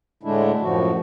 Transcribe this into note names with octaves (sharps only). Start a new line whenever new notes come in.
A2 D3 G#3 A3 D4 E4
F#2 A2 F3 F#4